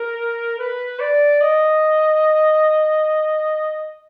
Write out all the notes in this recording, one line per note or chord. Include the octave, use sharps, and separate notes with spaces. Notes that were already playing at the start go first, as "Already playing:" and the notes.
Already playing: A#4
B4
D5
D#5